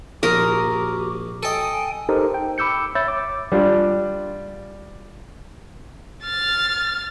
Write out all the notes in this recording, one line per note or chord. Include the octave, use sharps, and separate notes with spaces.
A#1 F#4 G4 A#4 D#6
A4 D#5 G5 G#5
D#4 G4 A4 A#4 C5
G5
B5 D6 E6 G6 C#7
C#5 E5 B5 E6 G6 A6
D6
G3 D4 F4
F6 A6